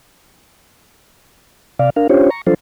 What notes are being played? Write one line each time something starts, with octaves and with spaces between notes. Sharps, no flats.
C3 D5 F5
D4 A#4 F5
C#4 D4 F4 G4 C5 C#5
A#5 C#6
F3 F#3 D4 F4 A4 C5